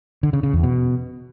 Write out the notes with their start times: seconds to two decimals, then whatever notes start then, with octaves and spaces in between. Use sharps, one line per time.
0.23 D3
0.33 C#3
0.43 C#3
0.53 E2
0.63 B2